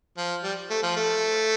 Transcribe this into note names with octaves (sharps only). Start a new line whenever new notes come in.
F3
G3
A3
F3
A3